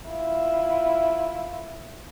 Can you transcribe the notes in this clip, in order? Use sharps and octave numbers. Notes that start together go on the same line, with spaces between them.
E4 F4